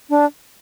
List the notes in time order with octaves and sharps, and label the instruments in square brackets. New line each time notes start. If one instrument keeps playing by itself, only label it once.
[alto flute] D4